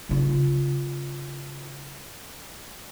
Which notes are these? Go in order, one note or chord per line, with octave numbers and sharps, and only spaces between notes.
C#3 F4